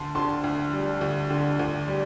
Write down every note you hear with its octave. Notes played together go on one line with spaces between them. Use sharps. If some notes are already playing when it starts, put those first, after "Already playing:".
Already playing: D2 A5 C6
D3 A5 C6
D2
G3
D2
D3
D2
G3